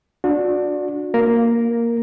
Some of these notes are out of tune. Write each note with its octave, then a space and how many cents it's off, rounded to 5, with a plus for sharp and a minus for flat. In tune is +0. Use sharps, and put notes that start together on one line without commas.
D4 +0 F#4 -35
A#3 +0 A#4 +0